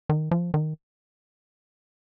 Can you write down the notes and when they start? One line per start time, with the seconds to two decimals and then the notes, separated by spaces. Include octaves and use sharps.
0.09 D#3
0.31 F3
0.54 D#3